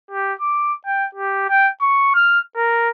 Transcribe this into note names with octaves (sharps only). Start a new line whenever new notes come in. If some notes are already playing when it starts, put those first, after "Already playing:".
G4
D6
G5
G4
G5
C#6
F6
A#4